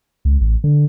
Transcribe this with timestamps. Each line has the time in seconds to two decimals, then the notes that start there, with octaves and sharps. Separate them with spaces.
0.25 C#2
0.41 A1
0.64 D3